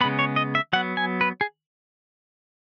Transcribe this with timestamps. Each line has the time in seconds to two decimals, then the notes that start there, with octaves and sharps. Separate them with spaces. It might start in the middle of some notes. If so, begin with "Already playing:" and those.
0.01 C#3 G#3 B3 B5
0.19 C#5
0.36 D#5
0.55 E5
0.73 F#3 B3 F#5
0.97 G#5
1.21 B4
1.41 G#4